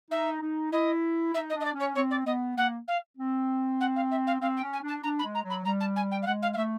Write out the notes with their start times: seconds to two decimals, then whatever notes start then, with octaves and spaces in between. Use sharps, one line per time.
0.11 D#4 E5
0.42 D#4
0.72 E4 D#5
1.34 D#4 E5
1.49 D#5
1.55 D4
1.60 D#5
1.64 D5
1.74 C#4
1.79 C#5
1.95 C4 C#5
2.10 D5
2.26 B3 D#5
2.56 A#3 F#5
2.87 F5
3.18 C4
3.80 F#5
3.96 F5
4.11 E5
4.27 F5
4.41 C4 F5
4.56 G5
4.62 C#4
4.73 G#5
4.83 D4
4.88 A5
5.03 D4 A#5
5.19 B5
5.24 G#3
5.34 A#5
5.44 F#3
5.49 B5
5.65 G3 A#5
5.80 A5
5.96 G#5
6.11 G5
6.22 F5
6.26 G#3 F#5
6.42 F5
6.53 F5
6.56 A3 E5